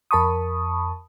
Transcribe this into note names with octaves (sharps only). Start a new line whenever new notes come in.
F2 A#4 A5 B5 C#6 D#6